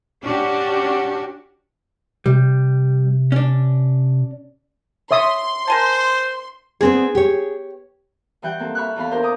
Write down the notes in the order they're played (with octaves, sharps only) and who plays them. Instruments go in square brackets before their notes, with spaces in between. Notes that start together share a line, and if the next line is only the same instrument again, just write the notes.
[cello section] C#4 F#4 G4 [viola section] D4
[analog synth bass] C3 [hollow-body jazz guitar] G3
[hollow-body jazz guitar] C#4 D4
[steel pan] C#5 E5 D#6 [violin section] C6
[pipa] A#4 G#5 A5 [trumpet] C5
[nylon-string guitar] B3 C4 D4 [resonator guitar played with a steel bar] G#4
[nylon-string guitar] G4 C#5
[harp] G2 E3 F#5 G5 F#6
A#3 C4 A4
E5 B5 C#6 F6 F#6
E2 E3 A4 F5 B5
D4 A#4 C5
C#4 D6 D#6